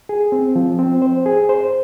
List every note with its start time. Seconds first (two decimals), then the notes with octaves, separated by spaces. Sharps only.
0.09 G#4
0.32 C4
0.56 F3
0.79 C4
1.02 C5
1.26 G#4
1.49 C5